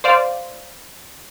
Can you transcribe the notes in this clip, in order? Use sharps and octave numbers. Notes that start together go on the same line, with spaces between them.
C5 D5 F5